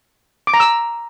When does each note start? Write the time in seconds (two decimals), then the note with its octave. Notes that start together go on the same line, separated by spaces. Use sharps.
0.47 D6
0.54 A#5
0.60 E6